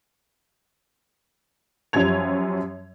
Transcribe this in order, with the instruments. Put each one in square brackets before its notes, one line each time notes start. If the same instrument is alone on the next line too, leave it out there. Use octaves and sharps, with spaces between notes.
[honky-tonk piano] F#2 F3 G3 C#4 G#6 F7